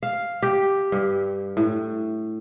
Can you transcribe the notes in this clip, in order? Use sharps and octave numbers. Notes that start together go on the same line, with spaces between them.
F5
G4
G2
A2